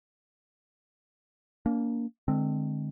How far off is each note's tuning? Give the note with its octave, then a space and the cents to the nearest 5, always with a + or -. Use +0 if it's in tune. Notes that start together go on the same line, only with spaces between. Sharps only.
A#3 +0 D4 -45
D3 +30 G#3 +10 C4 +0